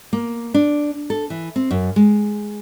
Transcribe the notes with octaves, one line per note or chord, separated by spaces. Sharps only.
A#3
D4
A4
E3
C4
F#2
G#3